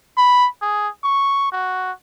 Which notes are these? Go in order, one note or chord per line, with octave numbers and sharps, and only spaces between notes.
B5
G#4
C#6
F#4